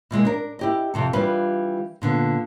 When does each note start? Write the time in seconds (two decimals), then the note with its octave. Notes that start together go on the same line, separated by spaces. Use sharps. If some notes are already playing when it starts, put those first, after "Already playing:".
0.11 B2 E3 G#3 A#3
0.25 D4 A#4
0.59 E4 G4 D#5
0.94 F2 C3 A4
1.13 E3 G3 D4 F4 B4
2.02 A#2 D3 B3